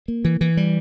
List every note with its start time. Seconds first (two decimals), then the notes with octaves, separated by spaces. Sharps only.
0.08 A#3
0.25 E3
0.41 E3
0.57 G3